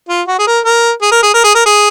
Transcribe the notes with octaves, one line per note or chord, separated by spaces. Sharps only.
F4
F#4
G#4
A#4
A#4
G#4
A#4
G#4
A#4
G#4
A#4
G#4